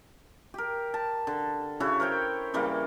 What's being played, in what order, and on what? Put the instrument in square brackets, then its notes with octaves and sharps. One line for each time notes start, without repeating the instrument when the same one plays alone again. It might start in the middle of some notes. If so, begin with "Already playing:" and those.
[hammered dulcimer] G4 A#4
A5
D3
C#3 E4 F#4 C#5
A#4 C5 C#5 G5
C#3 E3 G3 A#3